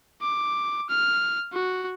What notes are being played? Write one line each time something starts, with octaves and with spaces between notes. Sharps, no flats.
D6
F6
F#4